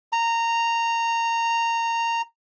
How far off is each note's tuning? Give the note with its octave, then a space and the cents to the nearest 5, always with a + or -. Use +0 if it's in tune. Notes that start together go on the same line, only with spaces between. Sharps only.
A#5 -15